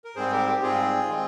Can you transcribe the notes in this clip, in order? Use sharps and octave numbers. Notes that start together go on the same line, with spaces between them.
A#4
G#2 G3 C4 G#4 C5
G4 A#4
G4
G#2 G3 C4 F4 G#4
D#3 G#3 C4